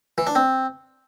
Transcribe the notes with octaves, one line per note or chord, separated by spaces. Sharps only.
E3
D4
C4